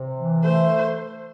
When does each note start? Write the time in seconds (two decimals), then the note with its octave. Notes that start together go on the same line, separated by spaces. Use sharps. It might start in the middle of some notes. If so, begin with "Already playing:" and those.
Already playing: C3
0.16 E3
0.43 A3 C5